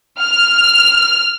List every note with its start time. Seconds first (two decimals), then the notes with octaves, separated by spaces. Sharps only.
0.21 F6